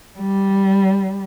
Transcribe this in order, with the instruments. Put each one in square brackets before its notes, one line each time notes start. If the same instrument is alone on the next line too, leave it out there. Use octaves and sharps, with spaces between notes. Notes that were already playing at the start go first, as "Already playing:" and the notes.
[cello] G3